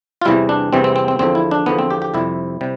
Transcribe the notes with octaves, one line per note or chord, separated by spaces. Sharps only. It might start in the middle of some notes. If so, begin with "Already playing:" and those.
F4
E2 C3 E3 G3 E4
D4
E2 C3 E3 G3 C4
C4
C4
C4
E2 D3 F3 C4
E4
D4
E2 D3 F3 B3
C4
G4
G4
F2 C3 G3 E4
C3 G3